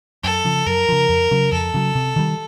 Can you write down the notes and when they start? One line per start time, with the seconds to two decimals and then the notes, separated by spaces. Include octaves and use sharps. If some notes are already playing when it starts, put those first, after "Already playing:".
0.24 F#2 A4
0.45 C#3 F3
0.66 F#2 A#4
0.89 C#3 F3
1.09 F2
1.31 C#3 F#3
1.52 F2 A4
1.74 C#3 F#3
1.95 C3
2.16 D#3 G3